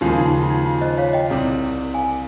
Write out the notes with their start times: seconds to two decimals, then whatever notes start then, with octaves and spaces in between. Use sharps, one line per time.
0.01 D#2 C#3 F3 G#3 G4
0.18 D#4
0.33 C#4
0.43 F4
0.50 D#4
0.65 F4
0.81 C5 D#5
0.98 C#5 F5
1.13 D#5 G5
1.30 C2 C3 G3
1.94 F5 G#5